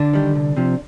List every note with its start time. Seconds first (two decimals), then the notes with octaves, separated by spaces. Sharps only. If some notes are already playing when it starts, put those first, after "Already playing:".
Already playing: D3 D4
0.13 D#3 G3
0.35 C2
0.57 C3 F3